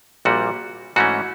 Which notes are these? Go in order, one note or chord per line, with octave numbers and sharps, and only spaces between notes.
A#1 A#2 G3 F#4
G#2 E3 A3 C#4 F#4